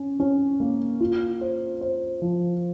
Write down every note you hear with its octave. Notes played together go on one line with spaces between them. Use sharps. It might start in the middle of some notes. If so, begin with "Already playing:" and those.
Already playing: C#4
C#4
A#3
F4
C5
C5
F3